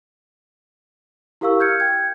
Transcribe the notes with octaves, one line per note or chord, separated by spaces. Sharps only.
E4 G4 A#4 F5 C#6 E6
F6 G6 G#6 C#7
G5 G#6